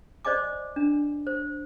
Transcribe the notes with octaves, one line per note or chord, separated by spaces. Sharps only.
C5 D5 D#5 G#5 D6
D4
C5